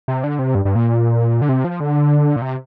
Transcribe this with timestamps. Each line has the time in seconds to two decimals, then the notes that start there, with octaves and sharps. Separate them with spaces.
0.08 C3
0.24 D3
0.39 C3
0.55 G2
0.65 G2
0.75 A#2
1.42 D3
1.49 C3
1.65 F3
1.80 D3
2.36 A#2
2.42 C3